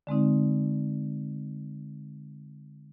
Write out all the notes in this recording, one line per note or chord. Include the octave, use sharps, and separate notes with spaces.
D3 G#3 C4 D#4